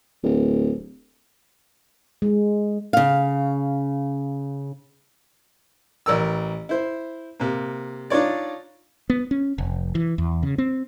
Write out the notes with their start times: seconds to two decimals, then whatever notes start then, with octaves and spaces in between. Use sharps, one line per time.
0.23 D1
2.22 G#3
2.93 C#3 F5
6.06 A1 A#4 E6
6.69 E4 C5
7.40 C3 A#3
8.10 D4 D#4 F4 C#5 D5
9.10 B3
9.31 C#4
9.58 F1
9.95 E3
10.18 E2
10.43 C#3
10.58 C4